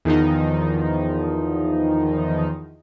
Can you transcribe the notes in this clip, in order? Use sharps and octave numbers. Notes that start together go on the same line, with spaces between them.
E2 D#3 F3 D#4